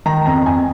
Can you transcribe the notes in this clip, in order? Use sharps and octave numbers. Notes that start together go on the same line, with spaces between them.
D#3 A#5
F2 A#5
F2 G#5